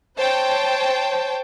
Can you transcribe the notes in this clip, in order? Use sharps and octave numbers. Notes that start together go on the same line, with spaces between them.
C5 C#5 G5 A5